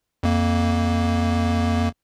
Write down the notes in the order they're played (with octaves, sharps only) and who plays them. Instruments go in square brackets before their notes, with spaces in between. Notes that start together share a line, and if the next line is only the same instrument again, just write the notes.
[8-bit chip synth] F2 A#3